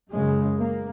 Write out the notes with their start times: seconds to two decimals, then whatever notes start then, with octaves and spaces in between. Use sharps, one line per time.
0.11 F#2 C#3 G#3
0.58 A#3